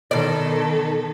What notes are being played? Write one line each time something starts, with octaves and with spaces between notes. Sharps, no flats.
B2 D#3 A4 D5